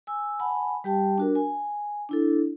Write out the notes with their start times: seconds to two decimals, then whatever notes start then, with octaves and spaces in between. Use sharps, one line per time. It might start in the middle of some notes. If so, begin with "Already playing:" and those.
0.07 G#5 E6
0.40 F#5 G#5 A5 B5
0.84 G3 G4 G5 A5
1.18 D4 F#4 A#4
1.35 G#5
2.09 D4 E4 A4